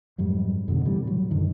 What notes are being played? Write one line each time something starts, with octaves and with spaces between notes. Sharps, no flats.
F2 G#2 F#3 G3
F2 B2 D3
A2 C3 E3 G3
A2 F#3
F#2 D3 D#3